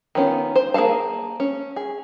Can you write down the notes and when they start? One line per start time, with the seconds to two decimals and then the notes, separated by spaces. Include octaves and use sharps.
0.15 D#3 B3 C#4 F4
0.56 C5
0.74 A#3 G#4 A4 F5 A5
1.40 C#4
1.76 G#4